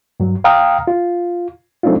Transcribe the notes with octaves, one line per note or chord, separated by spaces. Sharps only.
G2 F#3
F5 G5 A#5 D#6 F6
F4
F#3 A3 C4 D4 D#4 F4